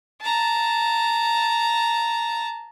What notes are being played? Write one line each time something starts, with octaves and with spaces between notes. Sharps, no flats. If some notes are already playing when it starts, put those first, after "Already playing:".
A5 A#5